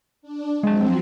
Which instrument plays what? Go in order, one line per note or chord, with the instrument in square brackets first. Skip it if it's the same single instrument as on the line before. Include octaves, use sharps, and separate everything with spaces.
[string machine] D4
[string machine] F3 F#3 C4 [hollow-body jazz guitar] G#3 A5